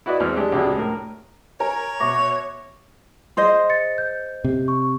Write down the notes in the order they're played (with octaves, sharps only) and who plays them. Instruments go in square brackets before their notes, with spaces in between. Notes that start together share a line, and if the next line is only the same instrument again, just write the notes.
[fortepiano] E4 F#4 B4 D5 D#5
E2 G#3 C4 F6
G#3 D4 G4
C#2 C3 D4 F#4 G#4 D5
A2 A#4
[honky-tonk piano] A#4 [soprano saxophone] C#5 [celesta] G#5
[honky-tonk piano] B2 [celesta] E5 D6 A#6 [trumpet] C#6
[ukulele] G#4 C5 D#5 [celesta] C6
[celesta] A6 C#7
G6
[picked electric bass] C3
[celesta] C#6